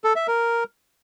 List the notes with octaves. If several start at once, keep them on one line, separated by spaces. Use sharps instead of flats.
A4
E5
A#4